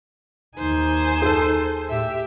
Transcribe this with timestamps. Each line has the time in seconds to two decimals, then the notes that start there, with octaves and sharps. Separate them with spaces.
0.57 D#2 D#4 C5 G#5
1.22 G#4 A4
1.89 A2 G4 E5